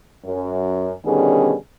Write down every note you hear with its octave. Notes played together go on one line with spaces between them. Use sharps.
F#2
B2 D3 D#3 G3 C#4 G#4